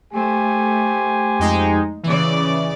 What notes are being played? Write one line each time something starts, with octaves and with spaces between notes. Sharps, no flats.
A3 G4 C5 G#5
F2 G#3 D#4
C#3 E3 D5